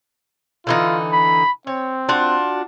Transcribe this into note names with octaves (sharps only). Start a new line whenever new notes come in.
D3 E3 D#4 F4
B5
C4 C#5
D4 F4 F#4